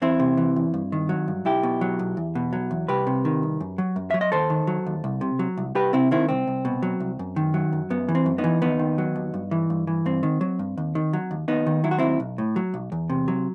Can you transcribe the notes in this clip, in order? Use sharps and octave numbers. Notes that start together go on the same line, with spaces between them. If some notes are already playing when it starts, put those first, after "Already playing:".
E2 C4 E4
C3
E3
E2
G2
D#3
F#3
G2
B1 E4 G4
B2
F#3
B1
E2
B2
F#3
E2
C2 G4 B4
C3
D#3
C2
F#2
F#3
F#2
F#3 E5
D#5
D#2 A4 C5
D#3
F#3
D#2
C2
C3
F#3
C2
C2 G4 B4
C3 C4 E4
D#3 C4 E4
C2 C4
C2
B2
F#3
C2
F#2
D#3
F#3
F#2
F#2 B3
E3
C4
F#2
B3 D#4
E3
D#2 B3 D#4
D#3
F#3
D#2
G2
E3
G2
E3
G2 C4
D#3
F#3
G2
D#2
D#3
F#3
D#2
D#2 B3 D#4
D#3
F#3 E4
F#4
D#2 C4 E4
B1
A2
F#3
B1
E2
C3
F#3